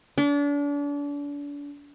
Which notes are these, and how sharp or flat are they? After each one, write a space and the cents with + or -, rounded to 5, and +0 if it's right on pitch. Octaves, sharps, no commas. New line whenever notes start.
D4 -35